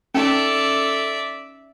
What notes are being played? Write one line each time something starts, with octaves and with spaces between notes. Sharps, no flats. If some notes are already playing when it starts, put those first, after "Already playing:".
C#4 D#4 A4 D5 E5